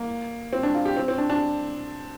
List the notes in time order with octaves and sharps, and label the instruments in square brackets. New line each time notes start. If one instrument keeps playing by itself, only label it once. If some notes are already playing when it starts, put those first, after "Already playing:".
Already playing: [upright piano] A#3
C4
D4
F4
G4
C4
C4
D4
D4